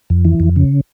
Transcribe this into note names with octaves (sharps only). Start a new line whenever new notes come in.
F2
E3
F2
C#3